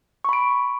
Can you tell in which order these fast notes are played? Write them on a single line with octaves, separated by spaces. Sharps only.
C#6 B5 D7